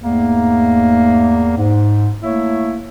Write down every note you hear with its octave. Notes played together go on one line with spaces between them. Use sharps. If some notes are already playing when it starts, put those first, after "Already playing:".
E2 G#2 A3 A#3
G#2
A3 A#3 E4 C#5